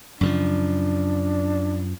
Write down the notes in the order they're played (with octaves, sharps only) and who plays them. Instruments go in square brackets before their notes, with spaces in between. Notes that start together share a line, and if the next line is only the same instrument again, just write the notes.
[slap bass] F#2 C#3 F3 [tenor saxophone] D4